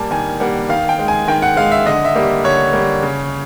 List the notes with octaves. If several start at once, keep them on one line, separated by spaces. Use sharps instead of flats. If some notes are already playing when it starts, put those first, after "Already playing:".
Already playing: G3 A#3 G#5 A5
D#3 G#5
G3 A#3 F#5
D#3 F5
G5
G#3
G#5
D#3 G5
F#5
G#3 F5
E5
D3 D#5
E5
G3 A#3
D3 C#5
G3 A#3
C#3